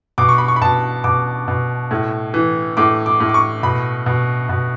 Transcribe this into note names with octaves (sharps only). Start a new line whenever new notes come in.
B2 D6
C#6
B5
C#6
B5
B2 A5
B2 D6
B2
A2
E3
A2 D6
D6
A2
D6
C#6
B2 B5
B2
B2